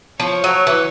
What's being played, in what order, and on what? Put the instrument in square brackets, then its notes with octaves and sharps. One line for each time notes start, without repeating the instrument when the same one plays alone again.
[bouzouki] F3 [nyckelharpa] C#5
[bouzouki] F#3
E3